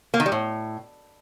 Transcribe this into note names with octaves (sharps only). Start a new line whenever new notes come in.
A#3
D#3
G3
A2